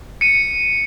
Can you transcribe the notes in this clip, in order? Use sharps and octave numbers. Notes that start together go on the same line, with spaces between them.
C#7 D#7